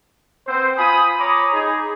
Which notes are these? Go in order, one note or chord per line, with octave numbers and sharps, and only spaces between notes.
B3 C4 C5
F4 G#5 B5 D#6
C#5 A#5 B5 D6 D#6
D#4 G#4